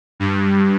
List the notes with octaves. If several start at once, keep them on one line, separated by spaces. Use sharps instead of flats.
G2